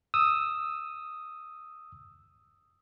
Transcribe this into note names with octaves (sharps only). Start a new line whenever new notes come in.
D#6 E6